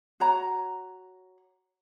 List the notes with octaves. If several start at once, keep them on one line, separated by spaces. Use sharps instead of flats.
F#4 C#5 A#5